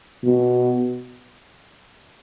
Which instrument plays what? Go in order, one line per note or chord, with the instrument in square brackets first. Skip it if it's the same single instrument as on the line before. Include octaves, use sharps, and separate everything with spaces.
[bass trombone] B2